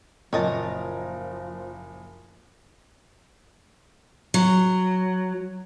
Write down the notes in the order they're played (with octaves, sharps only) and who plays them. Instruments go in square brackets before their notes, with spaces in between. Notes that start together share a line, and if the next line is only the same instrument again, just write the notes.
[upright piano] F#1 A#2 A#4 [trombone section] F3 [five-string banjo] C#5 D#5 A5
[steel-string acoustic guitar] F#3